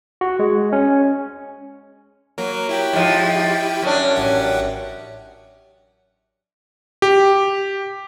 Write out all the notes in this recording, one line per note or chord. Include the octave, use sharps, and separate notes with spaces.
F#4
G#3
C#4
F#3 A#3 A#4
E4 G4 G5
G#2 F3
F#2 C#4 D4
A1 G4 F#5
G4